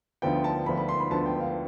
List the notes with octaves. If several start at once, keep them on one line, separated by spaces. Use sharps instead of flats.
D2 D3 F3 B3 G5
A5
D2 D3 F3 B3 B5
B5
C6
B5
D2 D3 F3 B3 A5
G5
F5